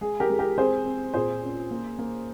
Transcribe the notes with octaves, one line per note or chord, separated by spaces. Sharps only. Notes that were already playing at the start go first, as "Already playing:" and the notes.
G#3 G#4
G4 A#4
G#3
G4 A#4
C4 G#4 C5
C4
A#2 G#4 C5
C#4
A#3
A#3